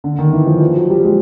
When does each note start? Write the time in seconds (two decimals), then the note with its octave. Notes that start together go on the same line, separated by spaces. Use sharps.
0.04 D3
0.19 D#3
0.33 E3
0.47 F3
0.61 F3
0.75 F#3
0.90 G3
1.04 G#3